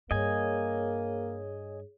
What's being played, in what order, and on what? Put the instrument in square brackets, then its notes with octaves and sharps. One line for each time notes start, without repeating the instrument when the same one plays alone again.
[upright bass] G2 [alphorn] A#3 [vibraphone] G#4 C#5 [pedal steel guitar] D#5 G#5